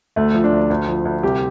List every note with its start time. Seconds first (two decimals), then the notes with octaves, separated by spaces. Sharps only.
0.16 D2 A3
0.34 F3
0.44 D4
0.52 D2
0.70 D2
0.88 F3
1.05 D2
1.23 C2 G4